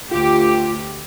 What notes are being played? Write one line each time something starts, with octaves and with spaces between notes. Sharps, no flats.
D2 F4 G4